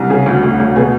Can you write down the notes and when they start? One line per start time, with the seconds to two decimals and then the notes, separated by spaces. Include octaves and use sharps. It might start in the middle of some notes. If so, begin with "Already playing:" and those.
Already playing: C2
0.10 C#3 G#4
0.26 D2
0.43 D2
0.60 D2
0.76 B2 G#4